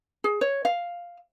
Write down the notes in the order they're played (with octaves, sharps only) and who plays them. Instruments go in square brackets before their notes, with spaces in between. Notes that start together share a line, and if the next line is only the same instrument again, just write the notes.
[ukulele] G#4
C#5
F5